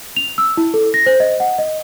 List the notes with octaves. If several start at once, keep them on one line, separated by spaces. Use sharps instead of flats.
F7
E6
E4
A4
A#6
C5
D#5
F#5
D#5